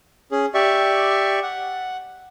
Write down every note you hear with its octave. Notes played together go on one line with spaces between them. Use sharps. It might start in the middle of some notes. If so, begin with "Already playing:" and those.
C#4 G#4
G4 D5 E5 C#6
F#5